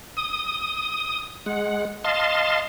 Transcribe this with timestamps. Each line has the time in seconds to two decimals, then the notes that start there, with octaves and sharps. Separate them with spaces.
0.17 D#6
1.46 G#3 F#5
2.04 D#5 F5 A5 C6